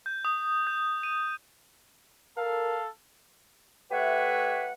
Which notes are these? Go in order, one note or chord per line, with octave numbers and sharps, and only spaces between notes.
G6
D#6
G6
D#7
A4 A#4 F5
A3 G4 B4 C#5 E5 F#5